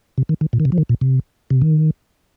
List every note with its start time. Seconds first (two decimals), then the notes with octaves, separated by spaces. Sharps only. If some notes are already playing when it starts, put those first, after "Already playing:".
0.18 C3
0.29 D#3
0.41 D#3
0.53 A#2
0.60 D#3
0.65 C3
0.72 F3
0.78 D#3
0.89 A#2
1.01 C3
1.50 C3
1.62 D#3